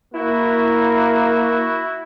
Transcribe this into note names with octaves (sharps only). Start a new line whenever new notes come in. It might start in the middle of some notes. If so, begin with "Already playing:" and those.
A#3 E4 F#4